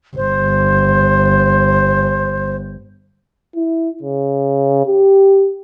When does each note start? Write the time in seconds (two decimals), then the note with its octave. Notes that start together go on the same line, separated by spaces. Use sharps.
0.17 G1 C5
3.55 E4
4.03 C#3
4.86 G4